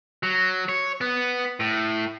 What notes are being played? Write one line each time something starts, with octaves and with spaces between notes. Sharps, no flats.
F#3
C#5
B3
A2